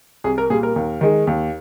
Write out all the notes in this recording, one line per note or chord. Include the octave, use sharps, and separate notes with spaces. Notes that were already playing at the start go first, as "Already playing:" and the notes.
C2 G#4
A#4
A#2 G3 G#4
A#4
D#2
D#3 G#3
D#2